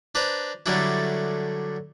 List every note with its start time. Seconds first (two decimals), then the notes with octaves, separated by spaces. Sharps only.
0.15 D4 B4 C5 A#5
0.66 D3 F#3 G3 A3 D4 E4